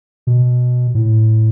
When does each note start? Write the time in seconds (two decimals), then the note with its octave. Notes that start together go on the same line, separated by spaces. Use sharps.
0.27 B2
0.95 A2